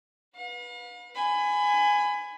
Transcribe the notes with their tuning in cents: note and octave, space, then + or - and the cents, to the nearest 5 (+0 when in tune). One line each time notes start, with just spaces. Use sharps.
B4 -15 F5 +45
G#5 +0 B5 +25